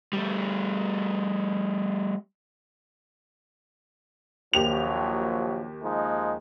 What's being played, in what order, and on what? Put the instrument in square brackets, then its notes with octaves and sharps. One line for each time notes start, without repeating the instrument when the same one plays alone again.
[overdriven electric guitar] G3 A3
[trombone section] A#1 F3 F#3 [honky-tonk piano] D#2 G4 F7
[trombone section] F3 G#3 D#4